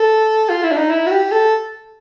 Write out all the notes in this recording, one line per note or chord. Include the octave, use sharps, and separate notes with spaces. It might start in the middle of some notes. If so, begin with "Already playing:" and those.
Already playing: A4
F4
E4
D4
D#4
E4
F#4
G4
A4